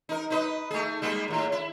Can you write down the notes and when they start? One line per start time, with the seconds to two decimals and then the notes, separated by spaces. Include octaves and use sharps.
0.09 D#4 A#4
0.30 D#4 B4 D#5
0.71 A3 G#4
1.02 G3 G#3 A#3
1.28 D#2 A2
1.52 E4